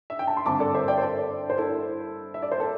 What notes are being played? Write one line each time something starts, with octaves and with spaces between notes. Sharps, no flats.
E5
G5
A5
C6
G2 D3 C4 A5 D6
A4 D5
C5 E5
D5 G5
C5
A4 D5
C5
E4 A4
E5
D5
C5
A4